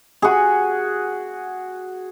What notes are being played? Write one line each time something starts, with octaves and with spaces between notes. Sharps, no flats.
F#4 G#4